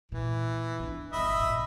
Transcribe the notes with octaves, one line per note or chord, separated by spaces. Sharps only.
A#2 E3
C#4 D4
G1 F2 D#5 E5 B5
A#1 A2